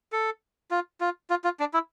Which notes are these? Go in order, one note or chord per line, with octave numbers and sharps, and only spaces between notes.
A4
F4
F4
F4
F4
D4
E4